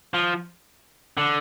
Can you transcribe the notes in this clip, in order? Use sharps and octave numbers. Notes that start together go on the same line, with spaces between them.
F3
D3